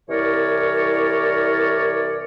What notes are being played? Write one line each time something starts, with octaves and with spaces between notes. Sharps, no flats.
C2 E3 A#4 C#5 D5